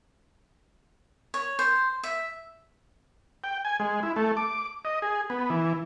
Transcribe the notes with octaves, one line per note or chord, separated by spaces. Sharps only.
C#5
C5
E5
G5
G#5
G#3
E4
A3
D6
D#5
G#4
B3
E3